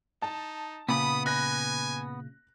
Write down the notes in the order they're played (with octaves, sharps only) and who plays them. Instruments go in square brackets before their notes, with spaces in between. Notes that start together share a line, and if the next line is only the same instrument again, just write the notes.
[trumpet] D#4 [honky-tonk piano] A5
[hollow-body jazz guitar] A#2 C#3 [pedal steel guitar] B3 B5 [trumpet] D#6
[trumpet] G#5 [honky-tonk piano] F#6 A#6